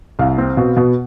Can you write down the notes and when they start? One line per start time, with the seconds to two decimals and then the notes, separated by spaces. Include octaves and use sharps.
0.19 C2 F5
0.38 C4
0.57 B2
0.77 B2